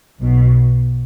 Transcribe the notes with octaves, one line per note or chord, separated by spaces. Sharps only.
B1 B2